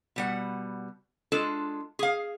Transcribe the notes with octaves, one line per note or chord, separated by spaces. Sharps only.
B2 G3 F#5
G#3 D4 F4 A4
G#4 F5